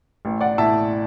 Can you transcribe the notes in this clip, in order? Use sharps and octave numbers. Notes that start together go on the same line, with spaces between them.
A1
D5 F#5
A2 E5 A5